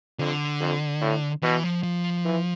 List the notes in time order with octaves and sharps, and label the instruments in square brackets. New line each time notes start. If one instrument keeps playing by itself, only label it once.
[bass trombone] F2 [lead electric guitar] D3
[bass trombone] F2
A2
[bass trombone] B2 [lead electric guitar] E3
[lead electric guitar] F3
F3
[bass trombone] E3